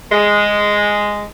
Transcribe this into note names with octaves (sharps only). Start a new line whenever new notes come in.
G#3